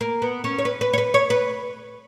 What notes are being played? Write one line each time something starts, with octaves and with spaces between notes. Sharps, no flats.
A#3
B3
C#4
C#5
B4
B4
C#5
B4
C#5
B4